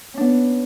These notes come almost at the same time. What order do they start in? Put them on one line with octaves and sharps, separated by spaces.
C#4 D4 B3